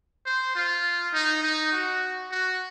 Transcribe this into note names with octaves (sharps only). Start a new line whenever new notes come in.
C5
F4
D#4
D#4
F#4
F#4